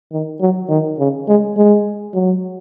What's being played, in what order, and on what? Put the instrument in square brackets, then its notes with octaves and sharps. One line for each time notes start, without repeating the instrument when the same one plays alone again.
[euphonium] D#3
F#3
D#3
C#3
G#3
G#3
F#3